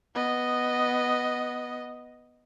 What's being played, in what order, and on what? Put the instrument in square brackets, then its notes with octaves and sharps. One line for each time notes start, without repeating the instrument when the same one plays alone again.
[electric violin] B3 D#5